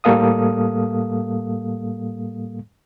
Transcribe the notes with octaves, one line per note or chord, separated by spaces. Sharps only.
A2 G3 A#3 A4 F5 D#6